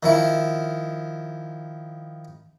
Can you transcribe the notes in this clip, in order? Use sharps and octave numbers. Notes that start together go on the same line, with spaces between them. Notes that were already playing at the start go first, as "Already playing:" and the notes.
D#3 F3 E4